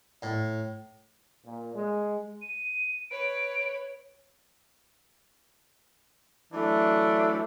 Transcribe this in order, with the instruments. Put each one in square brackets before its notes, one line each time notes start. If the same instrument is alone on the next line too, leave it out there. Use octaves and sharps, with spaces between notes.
[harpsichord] A2
[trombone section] A#2
G#3
[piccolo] D#7
[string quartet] B4 C#5 [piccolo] D7
[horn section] E3 F#3 A3 D4